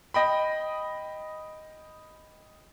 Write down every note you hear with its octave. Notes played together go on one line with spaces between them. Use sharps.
D#5 G5 B5